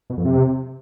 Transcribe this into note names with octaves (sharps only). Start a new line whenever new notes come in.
B2
F2
C3